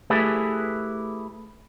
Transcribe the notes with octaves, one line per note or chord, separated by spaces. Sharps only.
A3 E4 G4 G#4 B4